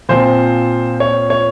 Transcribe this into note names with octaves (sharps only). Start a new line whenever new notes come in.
A#2 F3 C4 C5
C#5
C#5